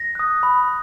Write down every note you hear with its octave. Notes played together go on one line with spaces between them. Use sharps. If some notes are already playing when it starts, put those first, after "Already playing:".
Already playing: A#6
D#6 F#6
B5